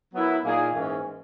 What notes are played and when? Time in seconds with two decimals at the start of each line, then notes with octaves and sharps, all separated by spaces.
0.13 F#3 B3 E4 A#4
0.44 A#2 A#3 D#4 G#4
0.74 G#2 E3 A#3 C#4